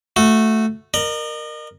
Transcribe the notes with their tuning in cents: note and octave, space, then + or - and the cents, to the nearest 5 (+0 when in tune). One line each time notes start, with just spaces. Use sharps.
A3 +0 F#4 -15
A#4 +0 D#5 -40